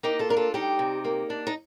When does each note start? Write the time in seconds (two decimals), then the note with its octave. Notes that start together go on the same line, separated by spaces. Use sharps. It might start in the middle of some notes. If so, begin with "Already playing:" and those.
0.03 A#3 D#4 G4
0.19 F4 A4
0.29 D4 A#4
0.37 F4 A4
0.54 G3 D#4 G4
0.79 C3
1.04 A#3
1.30 D4
1.47 D#4